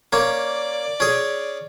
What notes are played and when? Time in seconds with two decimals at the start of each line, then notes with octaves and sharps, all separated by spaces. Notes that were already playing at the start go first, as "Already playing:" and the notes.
0.13 A#3 C#4 D5
1.00 C#4 G#4